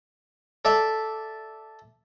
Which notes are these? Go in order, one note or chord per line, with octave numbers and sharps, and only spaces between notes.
A4 D5 E5